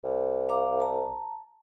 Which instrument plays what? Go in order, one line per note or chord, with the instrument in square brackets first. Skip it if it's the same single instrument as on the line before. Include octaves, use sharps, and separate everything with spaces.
[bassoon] C2
[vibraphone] F5 A#5 D6
A5 A#5